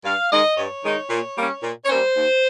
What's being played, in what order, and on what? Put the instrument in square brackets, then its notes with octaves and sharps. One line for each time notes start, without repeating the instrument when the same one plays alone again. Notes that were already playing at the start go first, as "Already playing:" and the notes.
[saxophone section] G2 F5
D#3 G#3 D#4 D#5
G2 C#5
D#3 G#3 D#4
A#2
G3 A#3 C#4
A#2
C#5
G3 A#3 C#4 C5
D#2